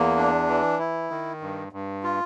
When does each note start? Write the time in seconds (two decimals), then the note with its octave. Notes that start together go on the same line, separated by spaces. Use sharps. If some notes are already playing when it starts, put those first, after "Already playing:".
Already playing: E2 A#3
0.17 D4
0.48 E3
0.79 E4
1.10 D#3
1.41 G2
1.73 G2
2.03 F4